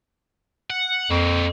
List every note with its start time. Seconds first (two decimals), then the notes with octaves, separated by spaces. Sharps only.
0.70 F#5
1.10 F2 A#3 C4